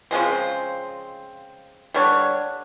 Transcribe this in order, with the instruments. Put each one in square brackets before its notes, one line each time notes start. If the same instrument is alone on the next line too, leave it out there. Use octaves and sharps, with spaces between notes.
[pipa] C#3 F3 G#3 C4
D3 G3 D4 C#5